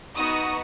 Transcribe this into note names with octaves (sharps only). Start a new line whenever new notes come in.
B3 D#4 F#4 D#6